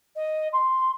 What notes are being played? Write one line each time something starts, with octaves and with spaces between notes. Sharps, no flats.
D#5
C6